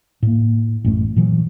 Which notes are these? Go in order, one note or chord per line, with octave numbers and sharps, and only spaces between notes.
A2 A#3
A1 F#2 A3
A#2 E3 F#3